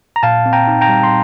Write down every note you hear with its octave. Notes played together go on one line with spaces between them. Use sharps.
A#5
A#2 F5 A5
C4
G5 A#5
D#4
G5 A#5
G3
C6